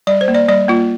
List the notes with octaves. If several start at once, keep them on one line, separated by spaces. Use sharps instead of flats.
G3 D5
C5
A#3
D5
G3 D5
A#3 F4